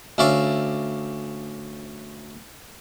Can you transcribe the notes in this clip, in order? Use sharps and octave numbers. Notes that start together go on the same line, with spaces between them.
D2 C#4 D5 E5 F5 D6